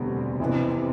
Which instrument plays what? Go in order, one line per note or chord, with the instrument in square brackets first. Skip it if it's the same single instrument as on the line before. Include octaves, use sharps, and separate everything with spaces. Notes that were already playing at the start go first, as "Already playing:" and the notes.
Already playing: [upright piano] E1 D2 D3 G3 C4 [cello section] B2
[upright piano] F2 E3 B3 [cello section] C3